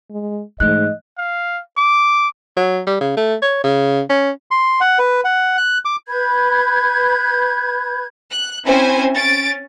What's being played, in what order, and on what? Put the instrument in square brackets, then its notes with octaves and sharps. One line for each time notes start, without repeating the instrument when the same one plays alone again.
[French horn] G#3
[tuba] G#2 [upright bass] E3 A3 [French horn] D#5 [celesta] F#6
[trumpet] F5
D6
[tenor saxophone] F#3
G3
C#3
A3
C#5
C#3
C#4
[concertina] C6
F#5
B4
F#5
F#6
D6
[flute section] B4 B5 G6 G#6
[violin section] F#6
C4 C#4 E4 C5 G#5
C#4 A6 D7